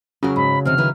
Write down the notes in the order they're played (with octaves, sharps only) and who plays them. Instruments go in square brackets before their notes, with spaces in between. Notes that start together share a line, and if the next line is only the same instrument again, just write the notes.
[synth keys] C#3 F#3 [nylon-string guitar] F#4 A#4
[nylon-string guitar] G#2 [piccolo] B5
[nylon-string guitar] C3 D#3 C4 [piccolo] F6
[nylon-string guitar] D#3 E4 B4